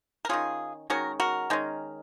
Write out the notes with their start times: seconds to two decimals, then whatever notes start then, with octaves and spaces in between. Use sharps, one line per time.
0.25 A#4
0.29 D#3 G#3 C#4 F4 G#4
0.90 D#3 G#3 C#4 F#4 A#4
1.20 F#4 A#4
1.50 D#3 G#3 C#4